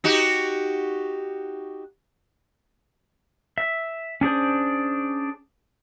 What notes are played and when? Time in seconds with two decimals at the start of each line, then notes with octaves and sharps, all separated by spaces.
0.04 D#4 F#4 G4
3.58 E5
4.21 C#4 D4 G#4 C5